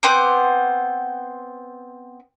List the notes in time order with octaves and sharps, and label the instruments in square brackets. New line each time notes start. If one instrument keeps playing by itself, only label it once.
[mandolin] B3 C4 C5 D6